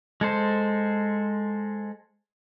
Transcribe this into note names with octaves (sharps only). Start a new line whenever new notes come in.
G#3 A4 C5